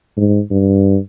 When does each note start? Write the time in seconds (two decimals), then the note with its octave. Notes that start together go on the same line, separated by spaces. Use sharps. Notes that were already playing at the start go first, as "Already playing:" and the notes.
0.17 G#2
0.51 G2